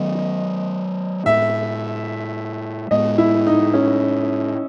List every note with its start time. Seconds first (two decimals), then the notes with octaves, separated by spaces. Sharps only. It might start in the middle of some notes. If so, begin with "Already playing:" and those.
Already playing: D#3 F#3 B3 D#5
1.26 A2 G#3 B3 E5
2.91 A2 G#3 B3 D#5
3.18 E4
3.47 D#4
3.74 C#4